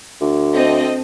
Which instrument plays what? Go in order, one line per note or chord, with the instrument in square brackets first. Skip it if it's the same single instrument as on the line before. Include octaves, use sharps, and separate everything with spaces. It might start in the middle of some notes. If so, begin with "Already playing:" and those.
[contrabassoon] D2
[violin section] C4 A4 D#5